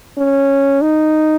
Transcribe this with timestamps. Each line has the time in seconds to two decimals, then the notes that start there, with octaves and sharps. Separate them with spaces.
0.18 C#4
0.82 D#4